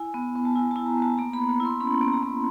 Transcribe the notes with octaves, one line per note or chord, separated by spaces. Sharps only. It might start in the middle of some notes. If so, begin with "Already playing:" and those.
Already playing: E4 G#5
B3
B3
A5
E4 G#5
E4 A5
A#5
B3 A5
A#3 A#5
B5
A#3
B5
E4 C6
C#4 B5
A#3
A#5
A#3